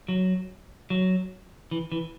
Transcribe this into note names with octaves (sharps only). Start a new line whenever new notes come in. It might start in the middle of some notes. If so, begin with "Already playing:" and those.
F#3
F#3
E3
E3